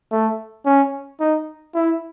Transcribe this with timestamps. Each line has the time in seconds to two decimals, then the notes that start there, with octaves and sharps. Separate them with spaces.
0.12 A3
0.66 C#4
1.20 D#4
1.74 E4